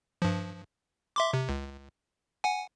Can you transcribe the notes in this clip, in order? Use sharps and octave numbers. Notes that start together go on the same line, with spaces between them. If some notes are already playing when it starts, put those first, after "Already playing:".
G2 F3
E5 C6 D6
C3
C#2
F#5 G#5